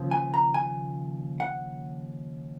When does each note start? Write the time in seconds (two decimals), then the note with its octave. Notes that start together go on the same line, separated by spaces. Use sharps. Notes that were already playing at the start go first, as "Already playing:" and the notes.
Already playing: D#2 C#3 F3
0.11 G#5
0.34 A#5
0.54 G#5
1.40 F#5